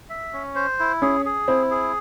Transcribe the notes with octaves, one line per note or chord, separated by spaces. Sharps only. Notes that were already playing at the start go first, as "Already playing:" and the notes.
E5
C#4
C5
E4
C#4 G#4
G#4
C4 E4
G#4